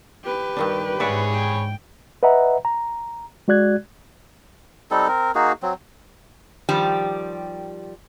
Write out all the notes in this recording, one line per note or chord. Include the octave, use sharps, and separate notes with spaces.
G4 B4
G2 D#3 D4
G#2 G#4 C#5 D5 E5 F#5 B5
G5
B4 D#5 E5 F#5 A#5
A#5
G#3 F#4 D5 F#6 G#6
G3 C4 D#4 A4
C4 A#4
A#3 D#4 F#4 G#4
F#3 C4
D#3 F3 G3 G4